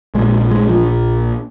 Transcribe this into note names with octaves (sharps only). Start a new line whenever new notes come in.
A#1 A#2 G#3
G#3
F3